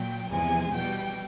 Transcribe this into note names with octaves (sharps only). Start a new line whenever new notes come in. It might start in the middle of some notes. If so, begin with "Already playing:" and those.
Already playing: A#2 F#3 G5
E2 C3 F3 G#3 G#5
B2 G3 G5